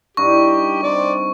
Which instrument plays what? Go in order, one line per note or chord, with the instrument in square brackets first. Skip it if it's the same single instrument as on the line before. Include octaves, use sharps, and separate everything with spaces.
[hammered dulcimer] G2 D#4 E4 [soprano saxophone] G4 [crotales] C#6
[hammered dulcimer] C3 C6 [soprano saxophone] D5